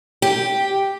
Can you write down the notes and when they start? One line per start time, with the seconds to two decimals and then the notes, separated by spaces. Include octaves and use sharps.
0.22 G4